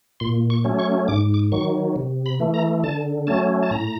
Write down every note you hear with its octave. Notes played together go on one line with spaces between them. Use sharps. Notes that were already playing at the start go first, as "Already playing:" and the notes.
A#2 C6
C#6
F#3 A3 C#4
C#6
G#2 D6
D6
D#3 F#3 C#6
C3
B5
E3 A3
A#5
D3 A5
F#3 A3 C#4 A5
A5
A2 A#5